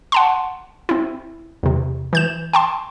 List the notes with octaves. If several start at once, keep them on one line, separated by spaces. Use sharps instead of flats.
F#5 A5 C6
C4 E4
E2 C3
E3 G6 E7
G5 A5 C6